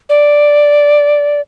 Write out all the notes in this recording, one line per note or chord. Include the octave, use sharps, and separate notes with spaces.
D5